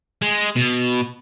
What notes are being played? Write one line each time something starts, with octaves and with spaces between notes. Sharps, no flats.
G#3
B2